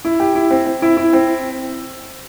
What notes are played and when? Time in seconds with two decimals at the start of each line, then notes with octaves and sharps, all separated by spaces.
0.05 E4
0.20 G4
0.35 E4
0.51 C4
0.66 C4
0.82 E4
0.97 E4
1.13 C4